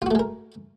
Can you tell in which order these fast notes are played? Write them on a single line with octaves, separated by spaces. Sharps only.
F4 F#4 A3 G#3 A#4